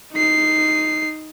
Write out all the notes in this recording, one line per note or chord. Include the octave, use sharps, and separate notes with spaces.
D#4 C7